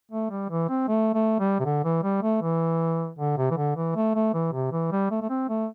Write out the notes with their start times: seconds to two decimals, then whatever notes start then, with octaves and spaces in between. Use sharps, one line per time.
0.12 A3
0.31 G3
0.50 E3
0.69 C4
0.88 A3
1.14 A3
1.40 G3
1.60 C3
1.65 D3
1.85 E3
2.03 G3
2.23 A3
2.42 E3
3.19 D3
3.37 C3
3.51 E3
3.57 D3
3.76 E3
3.95 A3
4.15 A3
4.34 E3
4.53 C3
4.72 E3
4.92 G3
5.11 A3
5.22 A3
5.30 C4
5.49 A3